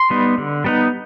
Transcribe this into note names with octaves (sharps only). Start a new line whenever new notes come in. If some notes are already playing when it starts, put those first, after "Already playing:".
Already playing: C6
G3 B3 D#4
D3
G3 B3 D#4